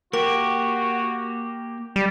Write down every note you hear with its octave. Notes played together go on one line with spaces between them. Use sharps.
A#3 F#4 G4 A#4
G3